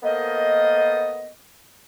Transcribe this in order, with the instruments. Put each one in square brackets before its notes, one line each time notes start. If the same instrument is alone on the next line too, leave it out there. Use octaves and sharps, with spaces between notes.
[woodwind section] A#3 B3 A4 A#4 C5 D#5